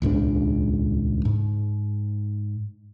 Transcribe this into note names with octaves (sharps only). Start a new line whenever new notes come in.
D#1 C#2 G#2 D4
G#2